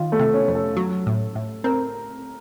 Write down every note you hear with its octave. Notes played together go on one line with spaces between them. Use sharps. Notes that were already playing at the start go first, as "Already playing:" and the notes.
Already playing: D#3 F4
A3
C3
C#4
F2
A4
F#3
A2
A2
C4 A#4